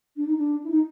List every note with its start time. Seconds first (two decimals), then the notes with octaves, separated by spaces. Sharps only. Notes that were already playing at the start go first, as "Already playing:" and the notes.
0.16 D4
0.26 D#4
0.37 D4
0.64 E4
0.71 D#4